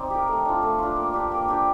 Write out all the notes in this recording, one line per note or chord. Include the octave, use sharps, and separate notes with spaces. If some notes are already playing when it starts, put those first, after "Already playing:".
Already playing: C4 D#4 D5
G4 A#4
A3
D4 F4
A3
D4 F4
A#3
D4 G4
A#3
D4 G4